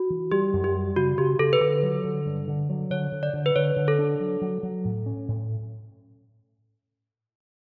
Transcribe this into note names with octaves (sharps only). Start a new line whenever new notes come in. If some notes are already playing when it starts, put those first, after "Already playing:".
Already playing: F#4
E3
G3 G4
F#2
G4
G3
C#3 F#4
C#3 G4
C#3 A4
B4
D3 A4
F#3
D3
G2
D3
F#3
D3 C#5
D3
D5
D3
B4
D3 C#5
D3
A4
D4
F#3
F#3
F#3
A2
C#4
A2